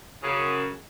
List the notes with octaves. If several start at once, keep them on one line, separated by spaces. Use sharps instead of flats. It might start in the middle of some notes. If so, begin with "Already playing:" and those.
F#2 C#3